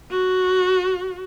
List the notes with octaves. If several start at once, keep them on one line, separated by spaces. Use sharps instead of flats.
F#4